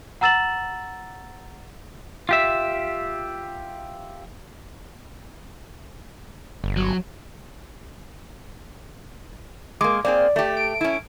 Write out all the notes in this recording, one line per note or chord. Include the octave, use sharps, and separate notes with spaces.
F#5 A#5 E6 A6 E7 F#7
F4 G4 E5
G1
F#3
G#3 A#3 D6
A#3 C4 G#4 D5
A3 G4
D7
C#4 E4